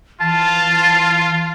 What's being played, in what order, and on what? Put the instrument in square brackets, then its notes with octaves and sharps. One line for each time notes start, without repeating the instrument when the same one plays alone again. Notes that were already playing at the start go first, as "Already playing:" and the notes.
[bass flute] E3 [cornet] F4 [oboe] A5